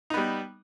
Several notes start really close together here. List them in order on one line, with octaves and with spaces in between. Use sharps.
D#4 B3 G3